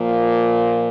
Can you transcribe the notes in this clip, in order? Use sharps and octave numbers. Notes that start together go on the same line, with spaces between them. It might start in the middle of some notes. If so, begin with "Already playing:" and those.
Already playing: A#2 F3 A#3